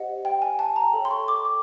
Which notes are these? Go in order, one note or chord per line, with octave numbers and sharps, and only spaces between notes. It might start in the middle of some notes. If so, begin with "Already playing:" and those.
Already playing: G4 C5 D#5 F#5
G5
G#5
A5
A#5
A4 C#5 E5 G5
C6
C#6
D6
D6